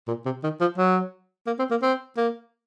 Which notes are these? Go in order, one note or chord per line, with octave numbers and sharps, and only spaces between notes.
A#2
C3
D#3
F3
F#3
A#3
C4
A#3
C4
A#3